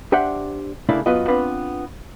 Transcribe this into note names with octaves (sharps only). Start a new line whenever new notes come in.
D4 G4 C5 D5 E5 F#5
C#3 A3 A#3 D4 E4 D5
F#2 B3 F4 F#4 B4 D#5
B3 C4 D4 F4 B4